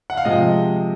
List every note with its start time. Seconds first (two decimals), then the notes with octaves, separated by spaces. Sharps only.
0.10 F#5
0.17 F5
0.25 C3 F3 G#3 D#5